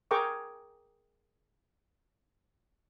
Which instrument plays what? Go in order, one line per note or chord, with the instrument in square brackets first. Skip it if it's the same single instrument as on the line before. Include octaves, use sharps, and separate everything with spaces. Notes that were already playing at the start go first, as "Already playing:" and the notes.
[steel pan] G#4 A#4 G5 A#5 C#6 D6